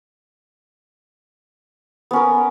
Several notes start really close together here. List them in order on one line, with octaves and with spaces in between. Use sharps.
B3 C#4 A#4